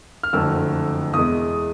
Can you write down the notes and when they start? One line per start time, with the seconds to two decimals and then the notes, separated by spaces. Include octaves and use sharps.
0.23 F6
0.33 F#1 F2 D3 F#3 A3 E6
1.14 E2 B2 G#3 D#6